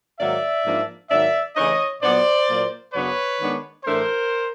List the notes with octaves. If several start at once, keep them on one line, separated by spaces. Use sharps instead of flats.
G#2 D#3 F#3 A#3 D5 E5
G#2 F3 A#3 D4
G#2 D#3 F#3 A#3 D5 E5
C#3 E3 A3 D4 C#5 D#5
A#2 F#3 B3 C5 D5
A#2 F#3 A#3
F#2 C#3 F#3 B3 D4 B4 C#5
D#3 G#3 B3 D4
A2 E3 A3 D4 A#4 C5